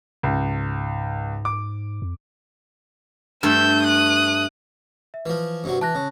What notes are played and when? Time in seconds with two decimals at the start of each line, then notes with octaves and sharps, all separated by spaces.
0.23 C#2 G#2
1.45 D6
2.02 F2
3.43 G2 A3 E6 G6
3.83 D#6 F#6
5.14 E5
5.26 E3 F3 B4
5.64 G2 C3 F#3
5.81 E3 A5 F#6 A#6
5.95 C#3